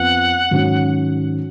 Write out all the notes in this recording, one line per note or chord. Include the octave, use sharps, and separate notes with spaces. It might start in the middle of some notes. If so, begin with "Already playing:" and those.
Already playing: F2 F3 B3 F#5
G#2 D#3 F#3 C#4 F#4